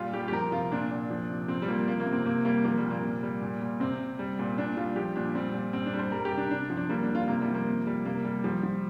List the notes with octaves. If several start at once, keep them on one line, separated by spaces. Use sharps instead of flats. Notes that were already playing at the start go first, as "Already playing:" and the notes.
Already playing: A#2 G3 F4
G3 G4
G4
F3 A#4
C3 F4
A#2 D4
A#2
F3
C3
F3 C4
G3
F3 A#3
C3 A#3
A#3
C3
C4
C3 A#3
G3 A#3
F3 A#3
G3
A#2
A#3
C3
G3
A#2
A#2
C3 C4
C3
G3
A#2
A#2 D4
G3 F4
F3 G4
A#2 D4
G3 C4
A#2
G3 C4
D4
G3
C5
G3 A#4
G4
C3
D4
C3 D4
F3
D4
G3 A#3
D4
G3
F4
C3 A#3
G3
F3
A#3
C3
G3
C3 A#3
G3
F3 G3
F3